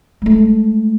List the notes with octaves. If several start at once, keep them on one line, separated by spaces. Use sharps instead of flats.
G#3 A3